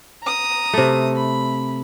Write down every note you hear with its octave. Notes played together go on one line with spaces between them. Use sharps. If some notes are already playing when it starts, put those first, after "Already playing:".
A#5 D#6
C3 A3
B5